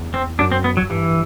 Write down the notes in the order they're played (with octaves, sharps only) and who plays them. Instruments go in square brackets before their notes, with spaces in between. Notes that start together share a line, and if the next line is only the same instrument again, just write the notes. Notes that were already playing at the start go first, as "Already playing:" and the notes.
Already playing: [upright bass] E2
[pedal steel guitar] C4
[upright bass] F#2 [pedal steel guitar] D4
[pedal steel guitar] C4
B3
F#3
[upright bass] F#2
[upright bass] G2 [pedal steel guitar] E3